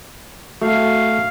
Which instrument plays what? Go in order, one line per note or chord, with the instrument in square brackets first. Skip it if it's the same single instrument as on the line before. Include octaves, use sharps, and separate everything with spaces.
[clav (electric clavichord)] A3 [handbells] F#4 C#6 [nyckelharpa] F5